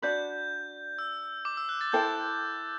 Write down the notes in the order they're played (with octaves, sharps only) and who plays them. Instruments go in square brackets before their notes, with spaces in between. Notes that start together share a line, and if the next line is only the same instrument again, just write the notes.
[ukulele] D4 F#4 B4 D5 [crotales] G6
[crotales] E6
D6
E6
F#6
A6
[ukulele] E4 A4 C5 G5 [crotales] G6